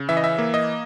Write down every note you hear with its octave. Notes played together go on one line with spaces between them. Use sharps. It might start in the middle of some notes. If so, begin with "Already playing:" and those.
Already playing: C#3
E3 E5
D#5
E5
A#3
D#5